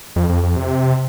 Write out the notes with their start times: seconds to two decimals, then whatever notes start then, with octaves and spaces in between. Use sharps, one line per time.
0.16 F2
0.29 F2
0.43 F2
0.56 C3